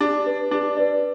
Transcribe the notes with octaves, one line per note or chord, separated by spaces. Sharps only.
D4 G4
B4 D5
D4 G4
B4 D5